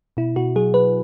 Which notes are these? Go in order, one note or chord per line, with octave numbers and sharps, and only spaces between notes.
B2 E4
B2 F#4
F#3 G#4
F#3 B4